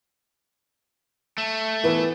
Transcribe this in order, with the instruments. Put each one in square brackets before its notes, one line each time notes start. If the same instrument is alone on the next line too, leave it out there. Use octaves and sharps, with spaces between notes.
[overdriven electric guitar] A3
[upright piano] E3 B3 B4